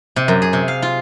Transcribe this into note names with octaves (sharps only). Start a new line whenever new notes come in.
C3
F#2
G#4
C3
F5
F4